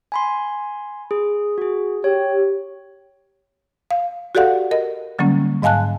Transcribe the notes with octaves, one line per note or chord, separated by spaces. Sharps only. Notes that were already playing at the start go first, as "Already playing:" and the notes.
G#5 B5 C6
G#4
F#4 G#4
G4 C#5
F5
F#4 G4 A4 D5 F5 F#5
A#4 D#5
D3 F#3 G3 A#3 C#4
G#2 D#5 F5 G#5 A5 F#6